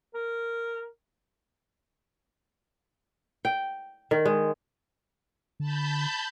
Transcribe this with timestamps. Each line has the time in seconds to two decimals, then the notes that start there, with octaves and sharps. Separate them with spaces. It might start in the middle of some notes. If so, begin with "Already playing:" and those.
0.14 A#4
3.45 G5
4.11 D#3
4.26 G#3
5.60 D3 A5 B5 G6